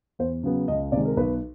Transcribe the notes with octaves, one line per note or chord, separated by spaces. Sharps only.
E2 C5
C#3 F#3 B3
C#2 D#5
C3 D#3 G#3 D5
A#4
B1 B4